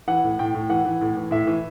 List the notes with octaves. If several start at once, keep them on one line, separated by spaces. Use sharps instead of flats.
E3 F#5
A2
A2 G5
A2
E3 F#5
E3
A2
E3
A2 E5
E3